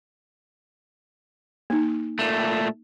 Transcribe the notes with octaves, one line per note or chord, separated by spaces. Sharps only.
A#3 D#4
A#2 A3